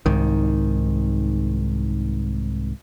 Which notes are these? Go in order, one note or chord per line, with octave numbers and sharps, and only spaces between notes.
C2 G#2 D#3